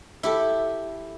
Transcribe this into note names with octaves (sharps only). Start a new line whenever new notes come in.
E4 G4 A4